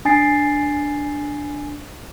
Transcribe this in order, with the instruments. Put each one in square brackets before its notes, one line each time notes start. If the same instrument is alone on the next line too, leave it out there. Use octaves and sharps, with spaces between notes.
[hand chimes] D4 G#5 A6 C7